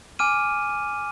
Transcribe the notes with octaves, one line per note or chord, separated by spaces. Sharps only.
G#5 D6 F6 D#7